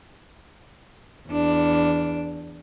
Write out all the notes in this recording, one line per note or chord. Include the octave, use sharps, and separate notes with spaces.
E2 D4